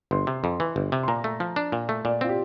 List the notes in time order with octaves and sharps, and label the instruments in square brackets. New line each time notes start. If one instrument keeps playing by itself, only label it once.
[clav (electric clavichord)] G1 [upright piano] C6
[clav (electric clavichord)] C3
F2
E3
G1
C3
[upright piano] C6
[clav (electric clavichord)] A#2 [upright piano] A#5
[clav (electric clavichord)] A3
F3
D4
A#2
A3
[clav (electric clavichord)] A#2 [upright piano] D5
[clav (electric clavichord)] C4 [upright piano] F4
[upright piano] G4